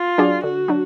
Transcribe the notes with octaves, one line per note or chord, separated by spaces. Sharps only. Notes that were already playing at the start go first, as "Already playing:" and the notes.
Already playing: F4
F#3 D4 G#4 D5
D3 F#4
F#3 D4